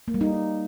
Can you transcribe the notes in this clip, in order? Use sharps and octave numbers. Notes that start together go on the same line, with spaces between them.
A#3
G3
D#4